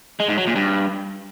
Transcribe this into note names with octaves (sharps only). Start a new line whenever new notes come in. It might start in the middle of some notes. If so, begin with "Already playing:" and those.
G#3
G#2
F#3
A#2
G2